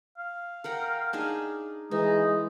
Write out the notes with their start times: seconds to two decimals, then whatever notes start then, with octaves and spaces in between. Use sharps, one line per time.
0.18 F5
0.64 A#4 F#5 G5
1.13 D4 D#4 G#4
1.91 E3 G#3 D#4